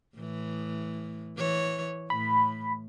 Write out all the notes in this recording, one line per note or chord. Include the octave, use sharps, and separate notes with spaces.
A2 E3
E3 C#5
A2 B5